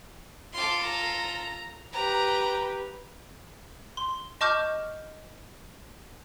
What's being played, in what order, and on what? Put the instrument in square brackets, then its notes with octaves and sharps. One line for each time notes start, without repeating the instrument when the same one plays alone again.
[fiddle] F4 A4 [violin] C6 D6
[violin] A#5
[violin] G4 B4 [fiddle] A#5
[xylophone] C6
D#5 A5 C#6 D6 F6 G6